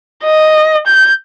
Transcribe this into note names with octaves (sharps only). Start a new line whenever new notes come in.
D#5
G6